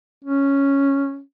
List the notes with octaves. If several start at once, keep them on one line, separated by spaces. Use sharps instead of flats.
C#4